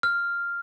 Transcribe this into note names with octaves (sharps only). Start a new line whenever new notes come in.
F6